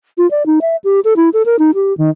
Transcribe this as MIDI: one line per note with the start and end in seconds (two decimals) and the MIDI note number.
0.18 0.29 65
0.31 0.46 74
0.46 0.59 63
0.61 0.76 76
0.84 1.00 67
1.05 1.14 69
1.16 1.29 64
1.33 1.42 69
1.46 1.59 70
1.59 1.71 63
1.75 1.96 67
1.98 2.10 51